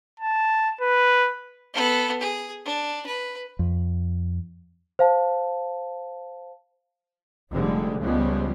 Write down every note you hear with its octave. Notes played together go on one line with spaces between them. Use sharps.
A5
B4
B3 A4
G#4
D4
B4
F2
C5 F5 A5
F1 D3 G3 G#3
C#2 F3 G3 G#3 B3